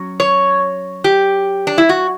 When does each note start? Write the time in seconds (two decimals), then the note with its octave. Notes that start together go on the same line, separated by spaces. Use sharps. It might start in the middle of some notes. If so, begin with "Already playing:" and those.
Already playing: F#3 C#4
0.20 C#5
1.04 G4
1.67 D4
1.78 E4
1.89 F#4